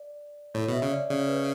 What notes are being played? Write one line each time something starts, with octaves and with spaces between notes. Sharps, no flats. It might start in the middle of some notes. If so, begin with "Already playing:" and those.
Already playing: D5
A2 C#5
B2 E5
C#3
D5
C#3 D5
C#5
B4
C#5